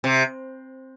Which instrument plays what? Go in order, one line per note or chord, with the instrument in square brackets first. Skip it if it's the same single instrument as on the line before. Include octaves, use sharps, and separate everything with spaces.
[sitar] C3